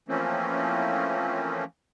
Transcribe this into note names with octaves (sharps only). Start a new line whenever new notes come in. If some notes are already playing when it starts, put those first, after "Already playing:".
E3 F3 A3 A#3 C4 C#4